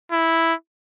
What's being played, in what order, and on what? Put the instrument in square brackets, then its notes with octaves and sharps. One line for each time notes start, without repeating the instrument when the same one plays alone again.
[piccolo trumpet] E4